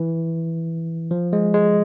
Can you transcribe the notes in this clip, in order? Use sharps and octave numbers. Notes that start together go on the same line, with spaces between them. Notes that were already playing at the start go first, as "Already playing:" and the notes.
Already playing: E3
F3
G#3
G#3